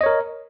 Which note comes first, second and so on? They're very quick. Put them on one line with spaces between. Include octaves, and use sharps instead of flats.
D#5 C#5 A#4